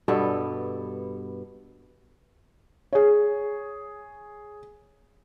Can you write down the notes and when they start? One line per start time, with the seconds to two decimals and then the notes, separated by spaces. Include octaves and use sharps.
0.08 G2 B2 B3 A4
2.93 G#4 C#5